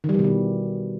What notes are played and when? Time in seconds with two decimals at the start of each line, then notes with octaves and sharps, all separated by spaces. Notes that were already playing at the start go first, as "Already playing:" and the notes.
0.04 D#3
0.09 G3
0.14 E3
0.19 B2
0.24 D#3